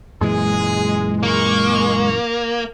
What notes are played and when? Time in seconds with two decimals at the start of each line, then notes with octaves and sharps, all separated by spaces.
0.21 F#2 A#2 E3 G#3 G#4
1.23 A#3 C#6